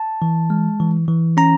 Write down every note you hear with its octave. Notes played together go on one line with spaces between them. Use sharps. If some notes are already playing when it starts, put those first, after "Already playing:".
Already playing: A5
E3
G#3
E3
E3
C#4 A#5